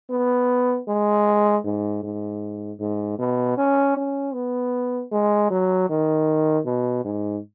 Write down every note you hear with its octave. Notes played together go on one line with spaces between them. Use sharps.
B3
G#3
G#2
G#2
G#2
B2
C#4
C#4
B3
G#3
F#3
D#3
B2
G#2